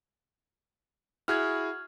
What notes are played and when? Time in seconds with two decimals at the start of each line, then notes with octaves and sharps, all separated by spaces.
1.28 E4 F#4 G#4 F6 F#6 G#6